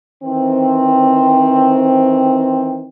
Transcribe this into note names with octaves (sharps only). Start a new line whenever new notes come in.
D#3 E3 C4